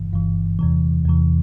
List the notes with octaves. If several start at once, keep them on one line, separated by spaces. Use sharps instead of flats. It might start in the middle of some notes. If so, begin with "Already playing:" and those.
Already playing: G1 G2 E3
G1 G2 E3
E2 C3 E3
E2 C3 E3